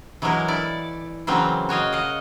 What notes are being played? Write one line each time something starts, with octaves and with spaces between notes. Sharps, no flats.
E3 F#3 G#3 A#3 E4 A#4
E4 A4 D5
C#3 E3 F#3 A#3 C4
F#4 C#5 D#5 F5
D#5 F5 F#5